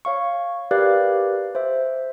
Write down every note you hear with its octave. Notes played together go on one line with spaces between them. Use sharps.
C#5 F5 C#6
G4 A#4 B4 D5 F5 F#6
C5 E5